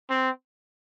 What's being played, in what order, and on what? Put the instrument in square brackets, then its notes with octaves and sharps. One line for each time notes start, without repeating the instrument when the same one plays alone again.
[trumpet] C4